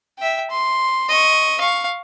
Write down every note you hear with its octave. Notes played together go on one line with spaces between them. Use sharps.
E5 G5
C6
D#5 C#6
F5 C#6